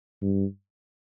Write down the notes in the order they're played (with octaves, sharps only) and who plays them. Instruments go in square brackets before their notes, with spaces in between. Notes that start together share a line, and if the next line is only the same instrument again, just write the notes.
[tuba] G2